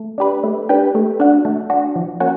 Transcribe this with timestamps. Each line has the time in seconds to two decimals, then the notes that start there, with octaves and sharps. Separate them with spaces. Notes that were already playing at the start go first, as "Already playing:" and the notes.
Already playing: A3
0.18 D4 G4 B4
0.44 A3
0.69 D4 G4 B4
0.95 A3
1.20 D4 F#4
1.45 A3
1.70 D4 F#4
1.96 F3
2.20 A#3 C#4 F#4